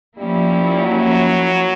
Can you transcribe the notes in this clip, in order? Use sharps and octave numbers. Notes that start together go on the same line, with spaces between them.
F3 G3 A#3 C#4 E4
F#3